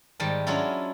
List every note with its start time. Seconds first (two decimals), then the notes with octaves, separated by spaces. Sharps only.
0.20 G#2 D#3 G3 A5
0.47 F#3 G#3 C#4 D4 E4 F4